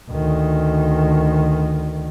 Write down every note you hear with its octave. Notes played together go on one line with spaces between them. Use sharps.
D2 D#3